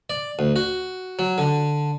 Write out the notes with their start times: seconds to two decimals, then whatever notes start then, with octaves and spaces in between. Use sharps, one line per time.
0.10 D5
0.39 D2
0.56 F#4
1.19 F#3
1.38 D3